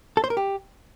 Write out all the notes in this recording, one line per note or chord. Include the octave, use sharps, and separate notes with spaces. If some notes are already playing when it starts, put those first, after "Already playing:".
A4
C5
A#4
G4